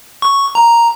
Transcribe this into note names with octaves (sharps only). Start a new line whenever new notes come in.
C#6
A#5